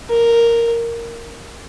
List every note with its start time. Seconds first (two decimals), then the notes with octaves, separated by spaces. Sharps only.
0.10 A#4